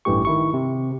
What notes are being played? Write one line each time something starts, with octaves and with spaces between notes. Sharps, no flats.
A1 G2 E3 A3 G4 C#6
D#3 E4 C#6
C3